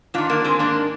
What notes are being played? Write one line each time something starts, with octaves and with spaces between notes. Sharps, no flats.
G#2 D#3 D4 F4
A#3 D4
G#3 C4
A#3 D4